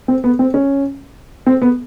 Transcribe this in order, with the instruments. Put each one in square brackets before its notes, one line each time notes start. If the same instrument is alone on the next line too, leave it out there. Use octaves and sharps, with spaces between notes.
[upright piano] C4
B3
C4
C#4
C4
B3